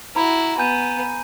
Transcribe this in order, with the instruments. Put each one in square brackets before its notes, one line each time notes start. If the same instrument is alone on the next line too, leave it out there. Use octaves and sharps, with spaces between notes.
[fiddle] E4 F#4 [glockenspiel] A#5 B5
[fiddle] B3 [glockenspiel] G#5 G6 D#7